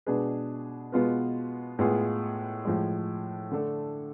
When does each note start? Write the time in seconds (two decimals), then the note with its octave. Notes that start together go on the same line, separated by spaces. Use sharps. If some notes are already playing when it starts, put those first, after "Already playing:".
0.06 B2 G#3 D4 G#4 B4
0.92 B2 G#3 B3 F4 B4
1.79 A2 G#3 B3 F4 G#4
2.65 A2 F3 G#3
3.51 D3 A3 D4 A4